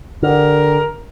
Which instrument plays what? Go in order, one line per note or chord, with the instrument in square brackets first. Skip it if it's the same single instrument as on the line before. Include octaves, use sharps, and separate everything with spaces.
[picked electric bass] D3 [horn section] G4 A#4